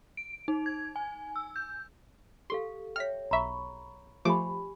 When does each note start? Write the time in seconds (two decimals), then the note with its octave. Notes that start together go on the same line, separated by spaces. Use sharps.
0.17 D7
0.48 D#4
0.66 G#6
0.96 G#5
1.36 E6
1.56 G6
2.50 G4 A4 F5 C6
2.96 C#5 E5 G5 F6 B6
3.31 B1 E5 A#5 B5 C#6
4.25 F3 A3 G4 G#5 B5 D6